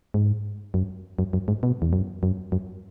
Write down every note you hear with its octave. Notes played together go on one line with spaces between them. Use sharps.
G#2
F#2
F#2
F#2
G#2
B2
E2
F#2
F#2
F#2